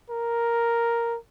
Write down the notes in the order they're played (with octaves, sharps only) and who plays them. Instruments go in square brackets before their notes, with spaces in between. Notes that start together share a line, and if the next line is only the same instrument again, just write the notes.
[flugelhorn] A#4